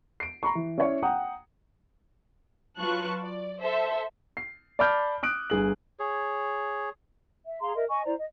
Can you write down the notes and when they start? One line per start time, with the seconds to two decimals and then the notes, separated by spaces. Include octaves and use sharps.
0.20 C7 D7
0.43 A#5 B5 C#6
0.55 E3
0.78 C#4 E4 C#5 D5
1.02 F#5 G5 A#5 D#6
2.79 F#3 F4 B4 A5 C#6 F#6
3.19 D5
3.62 A4 C5 E5
4.37 C7
4.79 D5 A5 B5 D6 F6 G6
5.23 D#6 F#6 D7
5.50 G1 G#4 F#7
5.99 G#4 C#5
7.47 E5
7.61 G#4 F5 A#5 C6
7.75 A#4 D#5 E5
7.89 D#5 G#5 C#6
8.05 E4 C5 D5 A#5
8.17 D#5